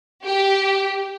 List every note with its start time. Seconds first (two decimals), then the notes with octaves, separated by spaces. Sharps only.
0.24 G4